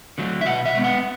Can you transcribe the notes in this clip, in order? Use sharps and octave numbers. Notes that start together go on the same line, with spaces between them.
D3 F#3 A3
E5
B2 F#5
E5
G#3 B3
F#5